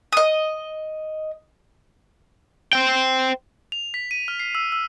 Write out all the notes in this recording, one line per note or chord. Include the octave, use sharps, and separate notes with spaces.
D#5 D#6
C5 G5
F7
B6
D#7
F6
C7
E6
E6